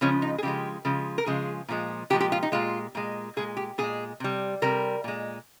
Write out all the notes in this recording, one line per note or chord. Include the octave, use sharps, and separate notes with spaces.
C#3 F3 G#3 C#4
D#4
G#4
C#3 F3 G#3 G4
C#3 F3 G#3
A#4
C#3 F3 G#3 G#4
A#2 F3 G#3
A#2 F3 G#3 G4
G4
F4
D#4
A#2 G#3 F4
A#2 G#3
A#2 G#3 G#4
G4
A#2 G#3 G#4
C3 G3
C3 G3 A#4
A#2 G#3